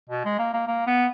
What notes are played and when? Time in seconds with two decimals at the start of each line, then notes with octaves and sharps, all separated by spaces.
0.10 B2
0.25 G#3
0.39 A#3
0.53 A#3
0.67 A#3
0.87 B3